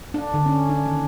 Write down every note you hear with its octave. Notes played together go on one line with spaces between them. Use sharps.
D4
D3
C#4
D4
D#3